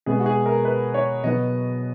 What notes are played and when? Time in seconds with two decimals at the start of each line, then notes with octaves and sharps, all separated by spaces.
0.06 B2 G#3 B3 G#4
0.19 F#4
0.26 G#4
0.46 A#4
0.65 B4
0.94 C#5
1.24 B2 F#3 B3 D#5